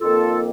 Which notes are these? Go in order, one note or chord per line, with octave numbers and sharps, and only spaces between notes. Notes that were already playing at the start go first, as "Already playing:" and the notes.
F2 D#3 A#3 F4 A4